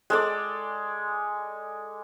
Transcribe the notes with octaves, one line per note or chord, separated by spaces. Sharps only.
G#3 A4 D5